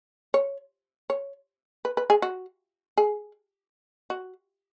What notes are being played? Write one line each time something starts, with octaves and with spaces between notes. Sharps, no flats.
C#5
C#5
B4
B4
G#4
F#4
G#4
F#4